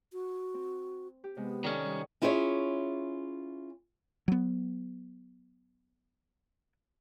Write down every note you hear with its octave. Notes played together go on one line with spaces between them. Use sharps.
F#4
C4
G4
C3 G#3 B3
D#3 C#4 D#4 A4 D5
G3
C#4 E4 F4 G#4 C5 C#5
F#3 B3